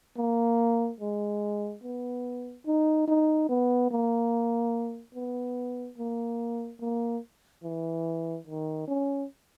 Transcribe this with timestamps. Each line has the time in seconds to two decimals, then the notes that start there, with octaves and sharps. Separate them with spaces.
0.17 A#3
1.00 G#3
1.84 B3
2.66 D#4
3.08 D#4
3.49 B3
3.91 A#3
5.15 B3
5.98 A#3
6.81 A#3
7.63 E3
8.47 D#3
8.88 C#4